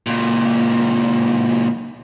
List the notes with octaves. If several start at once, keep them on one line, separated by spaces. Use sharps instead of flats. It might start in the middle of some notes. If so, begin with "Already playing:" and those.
C#2 A#2